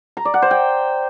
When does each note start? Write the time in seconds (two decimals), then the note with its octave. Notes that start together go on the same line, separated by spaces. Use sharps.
0.17 A#5
0.25 D5
0.34 F#5
0.42 C5
0.51 G5